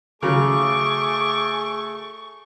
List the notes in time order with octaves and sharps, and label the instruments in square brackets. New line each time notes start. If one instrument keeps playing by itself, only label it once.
[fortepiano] C#3 F#3 [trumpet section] A3 G#4 [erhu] C#6 [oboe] D6